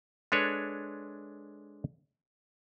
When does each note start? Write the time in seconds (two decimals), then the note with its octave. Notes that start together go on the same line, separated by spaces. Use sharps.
0.32 G#3 D4 A4 B4 C#5